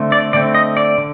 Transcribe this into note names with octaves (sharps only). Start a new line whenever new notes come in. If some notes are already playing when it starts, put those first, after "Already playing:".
Already playing: D3 A3 C4
D5
D3 A3 C4 D5
D#5
D5
D3